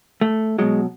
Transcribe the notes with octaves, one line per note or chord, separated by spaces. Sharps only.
A3
B2 F#3 G#3